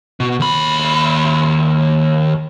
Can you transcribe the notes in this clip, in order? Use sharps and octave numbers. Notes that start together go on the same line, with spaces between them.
B2
D#2 B5